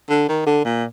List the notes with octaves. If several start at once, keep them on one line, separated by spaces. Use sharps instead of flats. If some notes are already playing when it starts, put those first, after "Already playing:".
D3
D#3
D3
A#2